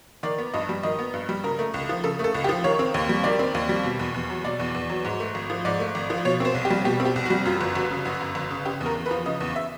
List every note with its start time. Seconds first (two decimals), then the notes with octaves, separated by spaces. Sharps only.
0.23 D#3 D5
0.38 B3
0.54 G2 D#5
0.69 G3
0.83 D#3 D#5
0.99 B3
1.14 G2
1.29 G3
1.44 C#3 A#4
1.59 A3
1.74 C#2
1.89 F3
2.04 C#3 A4
2.19 A3
2.24 A4
2.34 C#2
2.44 G4
2.49 F3
2.64 D#3 C#5
2.79 C4
2.94 D#2
3.09 G3
3.24 D#3 D5
3.39 C4
3.55 D#2
3.69 G3
3.85 B2
3.99 E2
4.14 E2
4.30 F#3
4.44 B2 D5
4.60 E2
4.75 E2
4.90 F#3
5.05 G#2
5.20 A3
5.35 G#1
5.50 F3
5.65 G#2 D5
5.80 A3
5.95 G#1
6.10 F3
6.25 B2 C#5
6.40 C4 C5
6.55 C2
6.65 G4
6.70 G3
6.85 B2 G4
7.00 C4
7.05 G4
7.16 C2
7.26 F#4
7.30 G3
7.46 F#2 F4
7.61 G1
7.75 G1 F#4
7.91 C#3
8.05 F#2 F#4
8.21 G1
8.35 G1
8.51 C#3
8.65 C#3 G4
8.81 E2
8.86 A#4
8.95 E2
9.06 B4
9.11 F3
9.26 C#3 D#5
9.40 E2
9.56 E5